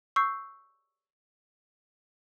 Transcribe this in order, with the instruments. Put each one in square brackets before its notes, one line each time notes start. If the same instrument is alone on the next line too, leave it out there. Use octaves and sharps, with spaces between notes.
[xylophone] C#6 E6 G6 C7